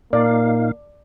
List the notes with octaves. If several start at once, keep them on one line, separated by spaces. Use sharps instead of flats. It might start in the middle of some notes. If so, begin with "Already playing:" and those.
A#2 A#3 D#4 D5 F5